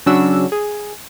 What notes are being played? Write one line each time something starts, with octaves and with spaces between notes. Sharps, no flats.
C#3 F#3 C#4 D4 F#4 E6
G#4